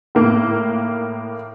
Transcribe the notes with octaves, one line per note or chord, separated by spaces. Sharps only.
A2 A#3